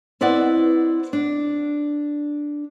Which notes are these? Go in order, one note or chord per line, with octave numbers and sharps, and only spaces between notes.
C4 E4 B4 D5 D#5 F#5
D4